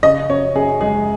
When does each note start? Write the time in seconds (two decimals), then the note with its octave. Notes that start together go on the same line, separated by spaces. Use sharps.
0.03 C#3 D#5
0.29 F#2 C#5
0.55 F#2 G#4
0.81 G#3 G#4